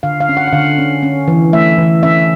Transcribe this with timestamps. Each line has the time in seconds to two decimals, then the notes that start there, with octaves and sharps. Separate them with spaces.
0.03 D3 F5
0.21 F5
0.29 C#4
0.37 F#5
0.48 F#5
0.53 D3 F5
0.78 C#4
1.03 C#4
1.28 E3
1.53 A3 E5
1.78 E3
2.03 C#4 E5